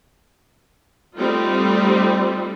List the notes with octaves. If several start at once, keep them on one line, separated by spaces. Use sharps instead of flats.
G3 A3 C4 D#4 F4